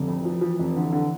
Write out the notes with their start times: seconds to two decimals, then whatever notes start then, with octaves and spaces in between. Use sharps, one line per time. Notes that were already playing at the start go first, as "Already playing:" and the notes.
Already playing: F1 D3
0.08 F2
0.25 E3 F3
0.41 F3
0.59 F1
0.76 D3
0.93 D3